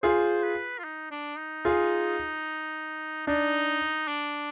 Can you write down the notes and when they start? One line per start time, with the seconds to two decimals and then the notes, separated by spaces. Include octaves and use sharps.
0.03 F4 G#4 C5
0.43 B4
0.78 F4
0.84 D#4
1.11 D4
1.38 D#4
1.65 F4 G#4
3.27 D4 D#4
4.08 D4